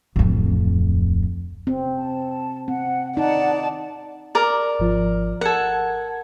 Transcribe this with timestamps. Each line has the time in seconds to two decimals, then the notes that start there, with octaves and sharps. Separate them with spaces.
0.16 D1 F2
1.67 C4
1.96 A5
2.68 C4 F#5
3.17 D#4 D5 F#5 A5
4.35 A#4 D5
4.79 G#1 F3
5.41 A4 A#4 F#5 G#6